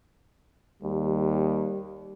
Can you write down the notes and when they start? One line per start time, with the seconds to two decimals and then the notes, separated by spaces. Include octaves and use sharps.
0.82 D#2 G3